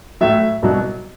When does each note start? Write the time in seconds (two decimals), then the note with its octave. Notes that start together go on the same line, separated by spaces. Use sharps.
0.21 A2 F#3 E5
0.62 C2 B2 F#3